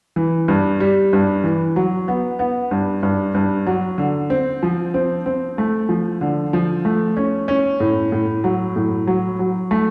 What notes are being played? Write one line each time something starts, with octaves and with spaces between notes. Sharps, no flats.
E3
G2
G3
G2
E3
F#3
B3
B3
G2
G2
G2
F#3
D3
C4
F3
C4
C4
A3
F3
D3
F3
A3
C#4
C#4
A2
A2
F#3
A2
F#3
F#3
A3